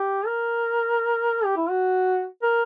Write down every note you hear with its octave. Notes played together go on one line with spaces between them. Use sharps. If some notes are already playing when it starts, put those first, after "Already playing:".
Already playing: G4
A#4
G4
E4
F#4
A#4